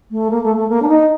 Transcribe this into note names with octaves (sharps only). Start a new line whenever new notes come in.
A3
A#3
A3
A3
A#3
D4
D#4